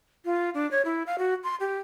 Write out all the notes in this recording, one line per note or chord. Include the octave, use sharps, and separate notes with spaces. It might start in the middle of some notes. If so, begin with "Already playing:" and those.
F4
D4
C#5
E4
F5
F#4
C6
G4